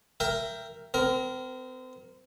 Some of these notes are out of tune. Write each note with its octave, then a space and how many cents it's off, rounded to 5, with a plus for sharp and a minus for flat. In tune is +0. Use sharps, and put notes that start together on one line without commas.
A#4 +0 E5 +25 G5 +0
C4 -35 A#4 +0